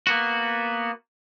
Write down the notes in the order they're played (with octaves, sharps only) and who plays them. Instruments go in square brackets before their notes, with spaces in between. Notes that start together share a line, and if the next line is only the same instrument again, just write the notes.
[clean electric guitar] A#3 B3 F#4